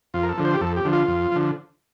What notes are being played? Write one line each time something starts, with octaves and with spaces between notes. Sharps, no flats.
F2 F4
A#4
A4
D3 F3
C5
G4
F2 A4
G4
D3 F3
F4
F2
D3 F3